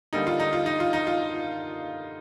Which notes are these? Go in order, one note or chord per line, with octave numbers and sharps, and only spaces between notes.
D3 G3 A#3 D#4
F4
D#4
F4
D#4
F4
D#4
F4